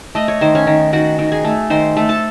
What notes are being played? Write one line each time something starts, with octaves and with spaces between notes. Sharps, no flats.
A3 D#5
C#5
D#3 C5
C#4 C#5
D#3
D#3 F#4 F#5
D#3
G#4 G#5
A3
D#3 C5 C6
A3
A4 A5